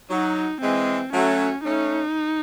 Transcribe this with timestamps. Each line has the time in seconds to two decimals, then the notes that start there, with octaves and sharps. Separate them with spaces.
0.10 F#3 D#4
0.61 E3 G#3 C4
1.13 F#3 A3 C#4
1.64 A3 C#4 D#4